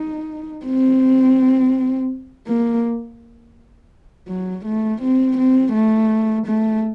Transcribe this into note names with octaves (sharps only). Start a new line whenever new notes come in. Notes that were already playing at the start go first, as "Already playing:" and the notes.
Already playing: D#4
C4
A#3
F#3
A3
C4
C4
A3
A3